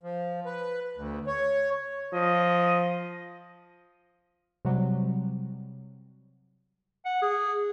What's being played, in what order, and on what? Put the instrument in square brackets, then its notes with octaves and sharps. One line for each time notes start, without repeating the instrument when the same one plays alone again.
[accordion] F3
B4
D2
C#5
[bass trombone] F3 [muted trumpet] D#5
[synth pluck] C3 F#3 G3
[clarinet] F#5
G#4